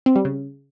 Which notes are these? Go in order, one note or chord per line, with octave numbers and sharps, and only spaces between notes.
C4
G3
C#3